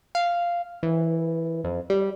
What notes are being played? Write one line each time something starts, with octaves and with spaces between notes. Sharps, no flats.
F5
E3
F2
G3